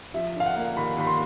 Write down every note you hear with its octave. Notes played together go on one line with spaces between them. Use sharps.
F3 E5
D3 F5
F#5
A#3
D#2 B5
D#2 B5
C6